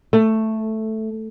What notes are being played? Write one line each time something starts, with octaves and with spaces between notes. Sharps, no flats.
A3